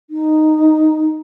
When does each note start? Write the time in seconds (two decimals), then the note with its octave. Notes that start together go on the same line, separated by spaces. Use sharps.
0.10 D#4